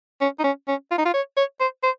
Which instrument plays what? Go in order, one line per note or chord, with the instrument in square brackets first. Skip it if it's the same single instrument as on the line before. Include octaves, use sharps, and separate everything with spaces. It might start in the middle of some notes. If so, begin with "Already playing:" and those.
[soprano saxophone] C#4
D#4
C#4
C#4
F4
D#4
F4
C#5
C#5
C5
C5